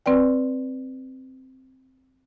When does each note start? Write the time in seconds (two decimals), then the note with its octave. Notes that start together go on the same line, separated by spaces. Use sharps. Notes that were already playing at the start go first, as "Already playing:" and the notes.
0.06 C4 B4 D5 G5